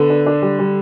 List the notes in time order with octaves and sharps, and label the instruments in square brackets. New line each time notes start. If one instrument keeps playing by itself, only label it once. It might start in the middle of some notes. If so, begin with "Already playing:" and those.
Already playing: [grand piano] D3 [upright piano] B3
[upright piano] D4
D4
G3
G3